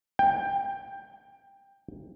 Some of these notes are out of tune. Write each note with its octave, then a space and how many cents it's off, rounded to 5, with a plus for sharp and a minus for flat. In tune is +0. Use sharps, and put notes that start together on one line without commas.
G5 +15